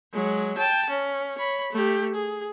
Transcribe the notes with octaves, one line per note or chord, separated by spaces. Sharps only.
F#3 G#3
G5 A5
C#4
C#5 B5
A3 G4
G#4